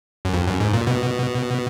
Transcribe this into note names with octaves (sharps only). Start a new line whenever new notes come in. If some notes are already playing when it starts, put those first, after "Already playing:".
F#2
F2
F#2
G#2
A#2
B2